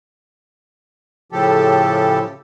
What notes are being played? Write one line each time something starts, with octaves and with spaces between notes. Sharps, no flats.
A2 C#3 F3 G4 A4